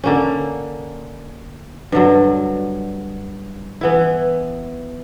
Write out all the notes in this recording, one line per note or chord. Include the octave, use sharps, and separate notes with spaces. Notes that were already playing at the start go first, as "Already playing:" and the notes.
D3 A#3 C#4
G2 D3 F#3
E3 B3 E4